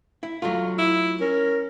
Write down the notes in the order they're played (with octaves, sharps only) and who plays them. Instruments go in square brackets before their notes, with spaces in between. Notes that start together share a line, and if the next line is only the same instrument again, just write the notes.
[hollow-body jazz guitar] E4
F#3 A3 F4
[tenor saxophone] E4
[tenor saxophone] C#4 [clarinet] A#4